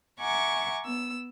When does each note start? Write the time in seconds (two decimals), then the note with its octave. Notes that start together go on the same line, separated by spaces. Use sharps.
0.20 E5 F#5 G#5 A#5 C#6 D6
0.85 B3 E6